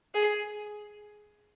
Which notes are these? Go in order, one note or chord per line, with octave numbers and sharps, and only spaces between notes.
G#4